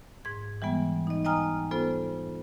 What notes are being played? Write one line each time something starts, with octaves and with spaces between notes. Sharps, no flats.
G#2 G#6
E3 G3 G#3 B3
D#4 D#5
D#5 G5 G#5 A#5 D#6 F6
B3 F4 A4 C5